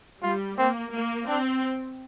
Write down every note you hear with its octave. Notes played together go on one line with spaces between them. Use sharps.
G3 F4
A#3 C4
A#3
C4 D4